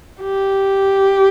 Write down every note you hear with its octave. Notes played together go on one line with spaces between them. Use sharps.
G4